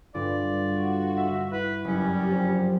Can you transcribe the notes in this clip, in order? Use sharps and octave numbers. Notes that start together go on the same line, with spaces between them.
G2 D3 F4 D5
F#4
E5
E4 B4
F#1 G3 C#4
F3 C4